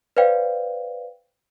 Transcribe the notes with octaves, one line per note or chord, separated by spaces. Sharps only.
B4 C5 D5 F5 G5